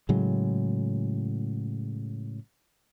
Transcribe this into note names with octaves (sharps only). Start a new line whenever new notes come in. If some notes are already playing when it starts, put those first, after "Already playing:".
A2 C#3 F#3 G#3